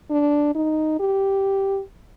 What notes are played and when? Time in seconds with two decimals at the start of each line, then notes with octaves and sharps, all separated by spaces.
0.10 D4
0.55 D#4
1.00 G4